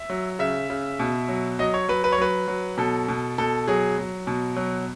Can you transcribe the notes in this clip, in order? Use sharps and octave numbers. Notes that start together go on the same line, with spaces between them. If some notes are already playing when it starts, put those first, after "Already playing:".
Already playing: E5
F#3
C#3 E5
C#3
B2
F#3
F#3 D#5
C#5
F#3 B4
B4
C#5
F#3 B4
F#3
B2 A4
B2
B2 A4
F#3 G#4
F#3
B2
F#3